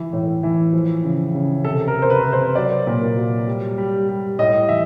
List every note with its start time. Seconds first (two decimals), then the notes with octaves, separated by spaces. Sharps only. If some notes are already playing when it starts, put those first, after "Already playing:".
Already playing: E3
0.13 A2
0.43 E3
0.73 F3
1.04 C#3
1.35 C#3
1.64 C3 A4
1.88 A#4
1.95 C3
2.02 C5
2.10 B4
2.25 C3
2.33 C5
2.55 F#3 D5
2.87 A#2
3.17 F#3
3.47 G3
3.78 G3
4.08 G3
4.39 A2 D#5
4.69 E3 E5